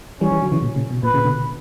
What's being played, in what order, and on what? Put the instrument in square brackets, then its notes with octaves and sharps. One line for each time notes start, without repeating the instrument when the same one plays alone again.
[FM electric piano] E3 G3 [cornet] C#4
[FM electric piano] E3 G3
D3 F#3
C#3 E3
A#2 C#3
A#2 C#3
B2
[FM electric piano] A#2 [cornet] B4
[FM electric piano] A#2 C#3
B2 D3